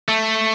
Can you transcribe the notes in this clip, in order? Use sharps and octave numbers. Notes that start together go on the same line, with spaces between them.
A3